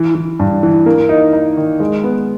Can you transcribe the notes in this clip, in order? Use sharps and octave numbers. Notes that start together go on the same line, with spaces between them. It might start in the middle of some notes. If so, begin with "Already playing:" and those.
Already playing: E3
E3
G2
E3
A#3
D#4
D#4
D#3
G#3
B3